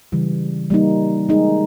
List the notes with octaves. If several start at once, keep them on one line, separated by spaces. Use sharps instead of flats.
C#3 E3 G3
G3 A#3 D#4
G#3 D#4 G#4